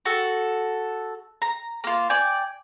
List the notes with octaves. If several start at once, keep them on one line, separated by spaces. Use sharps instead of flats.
F#4 A4
A#5
A#3 F4
D5 G5 G#5